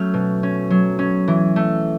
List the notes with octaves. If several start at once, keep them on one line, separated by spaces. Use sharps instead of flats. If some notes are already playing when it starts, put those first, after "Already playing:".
Already playing: F#3 A3 C#4 C#6 F6 G6
B2
C#4
F#3
C#4
E3
A3